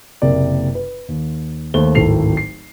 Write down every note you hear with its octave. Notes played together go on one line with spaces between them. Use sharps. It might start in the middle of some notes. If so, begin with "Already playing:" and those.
F#1 C3 A#3 D5
B4
D#2
D#2 A3 C5 G7
D1 G#1 A4 C7 F7
C7